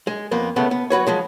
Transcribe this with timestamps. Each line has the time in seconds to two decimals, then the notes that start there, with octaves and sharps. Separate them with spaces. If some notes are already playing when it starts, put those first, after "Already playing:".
0.07 G#3
0.31 F2 A#3 B3
0.56 A2 C#3 A3 B3
0.71 B3
0.90 F#3 F#4 B4 C#5
1.07 F3 F#3 G#3